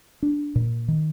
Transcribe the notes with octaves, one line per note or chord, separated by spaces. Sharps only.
D4
A#2
D#3